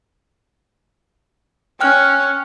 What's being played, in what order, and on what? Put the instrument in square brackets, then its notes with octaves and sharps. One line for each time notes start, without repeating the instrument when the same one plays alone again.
[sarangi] C#4 [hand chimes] G5 F6 F#6